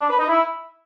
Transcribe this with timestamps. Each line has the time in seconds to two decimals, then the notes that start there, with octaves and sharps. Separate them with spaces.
0.01 D4
0.10 B4
0.19 D#4
0.28 E4